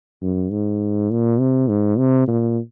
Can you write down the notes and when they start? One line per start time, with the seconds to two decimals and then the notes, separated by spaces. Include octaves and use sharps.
0.22 F#2
0.51 G#2
1.11 A#2
1.40 C3
1.69 G#2
1.98 C3
2.28 A#2